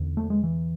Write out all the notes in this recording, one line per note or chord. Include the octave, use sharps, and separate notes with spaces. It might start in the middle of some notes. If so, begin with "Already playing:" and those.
Already playing: E2 D3
A3
G#3
E3